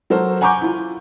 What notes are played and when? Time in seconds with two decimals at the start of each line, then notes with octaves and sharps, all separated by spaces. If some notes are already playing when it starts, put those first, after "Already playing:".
0.10 F#3 F#4 A4 A#4 C5
0.41 F#5 G#5 A#5 C#6 D6 G6
0.61 E4 F4